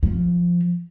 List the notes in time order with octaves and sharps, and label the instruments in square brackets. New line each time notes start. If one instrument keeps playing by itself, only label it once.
[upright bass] F3